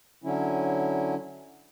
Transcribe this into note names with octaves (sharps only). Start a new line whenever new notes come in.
D3 F#3 C#4 E4